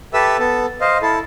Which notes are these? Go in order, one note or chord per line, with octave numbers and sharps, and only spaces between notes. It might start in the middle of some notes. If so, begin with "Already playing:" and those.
G4 A4 B4 E5 E6
B3 A4
C5 D#5 F5
E4 A4